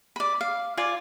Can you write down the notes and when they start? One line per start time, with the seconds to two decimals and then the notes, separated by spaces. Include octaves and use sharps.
0.16 D5 B5
0.41 F5
0.77 F4 D5 G#5